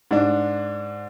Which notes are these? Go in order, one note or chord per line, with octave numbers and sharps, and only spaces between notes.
G#2 D4